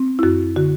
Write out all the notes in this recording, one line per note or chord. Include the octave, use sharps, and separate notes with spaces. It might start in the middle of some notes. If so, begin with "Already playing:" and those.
Already playing: C4
E4
F#2 F#4
D3 F#4